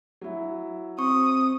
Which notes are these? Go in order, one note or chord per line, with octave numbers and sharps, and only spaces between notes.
F#3 E4
C4 C#6 D#6